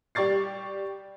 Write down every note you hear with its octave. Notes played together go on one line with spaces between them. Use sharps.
G3 G4 D5 C#6 A6 C7